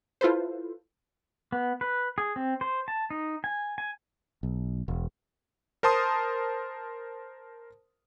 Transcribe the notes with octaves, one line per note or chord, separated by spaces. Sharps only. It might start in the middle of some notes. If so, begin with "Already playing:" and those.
E4 F4 A4 B4 C5
B3
B4
G#4
C4
C5
A5
D#4
G#5
G#5
B1
E1
A#4 C5 A5 C6 D#6